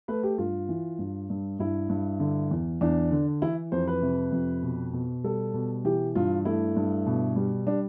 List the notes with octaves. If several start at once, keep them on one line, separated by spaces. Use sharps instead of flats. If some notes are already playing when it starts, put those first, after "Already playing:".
A3 B4
G4
G2 F4
E3
G2
G2
G2 E4
G2
D3
E2
E2 D4
D3
E3 E4
F2 C5
B4
C3
F2
B2
B2
G3 A4
B2
E3 G4
G2 F4
A3 E4
G2
B2
G3
G3 D4